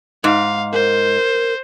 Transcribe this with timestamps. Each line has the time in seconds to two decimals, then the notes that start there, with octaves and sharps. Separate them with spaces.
0.24 G#2 F5
0.73 A#4 C5